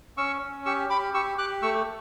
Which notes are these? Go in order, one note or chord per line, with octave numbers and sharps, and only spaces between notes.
C#4 C#6 E6
C#4
G4 C#6 E6
G4 B5 D6
G4 C#6 E6
G4 D6 F#6
A3 C#6 E6